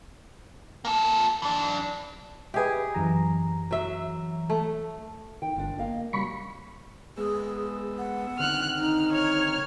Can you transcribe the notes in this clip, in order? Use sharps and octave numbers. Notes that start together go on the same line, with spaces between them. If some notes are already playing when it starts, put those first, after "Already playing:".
A#3 A4
E3 D4
G4 G#4 B4 D#5 E5
F#2 E3 A#5
F#3 E5
A3
D#3 G5
G1 D4 F4
A#3 D#5 F5
C#3 F#3 G3 A#3 B5 C#6
G#3 B3 G#4 E6
F#5
D3 D#3 C4 F6 F#6
D#4 F6
C#5 F6